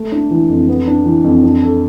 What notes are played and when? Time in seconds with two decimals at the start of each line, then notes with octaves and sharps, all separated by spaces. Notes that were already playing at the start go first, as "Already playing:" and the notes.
Already playing: A3
0.12 D4
0.31 E3
0.49 F2
0.69 B3
0.87 D4
1.05 E3
1.24 F2
1.43 D4
1.62 A4